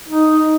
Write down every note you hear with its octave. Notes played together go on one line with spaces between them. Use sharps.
D#4